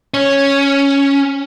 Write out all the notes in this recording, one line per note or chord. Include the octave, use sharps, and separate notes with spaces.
C#4